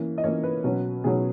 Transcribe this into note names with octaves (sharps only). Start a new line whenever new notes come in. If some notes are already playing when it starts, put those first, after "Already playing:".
Already playing: E3 A#3 C#4
D#5
E3 A#3 C#4 C#5
B4
B2 F#3 C#4
B2 F#3 C#4 G#4